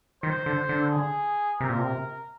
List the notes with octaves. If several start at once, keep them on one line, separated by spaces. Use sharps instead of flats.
D#3 C5
D3
D3
G#4
C3 A#4
A#2
C3